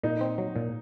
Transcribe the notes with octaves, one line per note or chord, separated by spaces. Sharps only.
A#2 D#4
C4
F#3
A#2